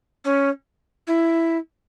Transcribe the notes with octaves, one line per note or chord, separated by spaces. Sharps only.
C#4
E4